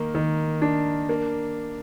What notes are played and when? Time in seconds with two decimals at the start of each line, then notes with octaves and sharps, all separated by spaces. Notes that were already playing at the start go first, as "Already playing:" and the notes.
Already playing: D#3 A#3
0.15 D#3
0.62 D4
1.09 A#3